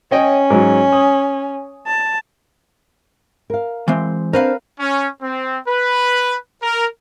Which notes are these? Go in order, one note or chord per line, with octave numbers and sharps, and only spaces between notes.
C#4 C#5 D#5 G5
G#2 F#3
D#6
A5
A#4 F5
E3 G#3 C4
C4 D4 A#4 B4 F5
C#4
C4
B4
A#4